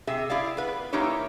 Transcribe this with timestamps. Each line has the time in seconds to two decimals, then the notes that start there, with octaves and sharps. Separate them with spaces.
0.07 C3 G#4 E5
0.30 E4 G4 G#4 D5 F5
0.57 B3 B4
0.93 E3 A#3 D#4 E4 G4 C#5